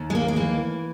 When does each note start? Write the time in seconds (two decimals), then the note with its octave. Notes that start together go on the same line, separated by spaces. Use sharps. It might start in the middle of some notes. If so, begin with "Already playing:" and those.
Already playing: D#2
0.10 G#3
0.15 A#3
0.28 G#3
0.36 E3 A#3